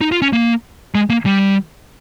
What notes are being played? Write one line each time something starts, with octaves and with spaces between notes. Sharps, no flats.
D#4
F4
C#4
A#3
G#3
A#3
G3